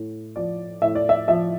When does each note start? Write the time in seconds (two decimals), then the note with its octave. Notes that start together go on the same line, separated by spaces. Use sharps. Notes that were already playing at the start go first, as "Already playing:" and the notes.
Already playing: A2
0.36 F3 D5
0.82 A2 E5
0.95 D5
1.09 E5
1.28 F3 E5